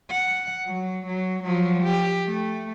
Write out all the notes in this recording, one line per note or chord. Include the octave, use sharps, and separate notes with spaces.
F#5
F#3
F#3
F3 F#3
G4
A3